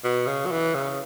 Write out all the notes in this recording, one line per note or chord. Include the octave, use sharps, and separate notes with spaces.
B2
C#3
F#3
E3
C#3